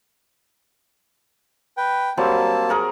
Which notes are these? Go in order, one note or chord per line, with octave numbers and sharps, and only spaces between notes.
B4 G5
F#3 G3 A#3 C4 A5
G#4 A#4 F#5